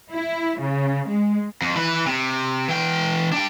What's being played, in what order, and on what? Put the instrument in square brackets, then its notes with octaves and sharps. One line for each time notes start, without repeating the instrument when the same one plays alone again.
[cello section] E4
C#3
G#3
[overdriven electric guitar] F2
E3 B4
C3
E3 G5
D4 G5